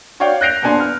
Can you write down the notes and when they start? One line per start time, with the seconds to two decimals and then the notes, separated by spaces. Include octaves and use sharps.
0.20 F#4 C#5 D5 F5 G5
0.41 F#6 G6 A#6 C7 D7 F7
0.62 D#1 B3 D4 G#5 C6
0.80 F6